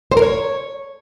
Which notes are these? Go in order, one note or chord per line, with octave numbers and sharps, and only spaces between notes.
C5
A#4
C#5